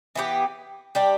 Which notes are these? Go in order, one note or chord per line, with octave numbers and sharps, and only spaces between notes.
E3 B3 D4 G4
G3 D4 G4